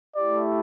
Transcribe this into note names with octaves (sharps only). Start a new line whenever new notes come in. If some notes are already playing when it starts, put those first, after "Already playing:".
A3 E4 G4 D5